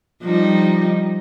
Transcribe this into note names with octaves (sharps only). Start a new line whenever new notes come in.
F3 G3 D#4